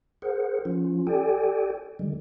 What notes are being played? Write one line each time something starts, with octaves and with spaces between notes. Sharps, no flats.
G#4 A#4 C5 F#5
F3 C#4 F4
G4 A4 D5 G5 G#5
D3 D#3 G3 G#3